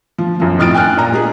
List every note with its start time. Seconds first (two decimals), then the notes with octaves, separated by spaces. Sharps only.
0.18 F3
0.40 F#2 F3
0.58 F2 A2 D#6 F6 A6 D7
0.74 G5 G#5 F6 F#6
0.98 A#2 A#5
1.12 G#3 G4 G#4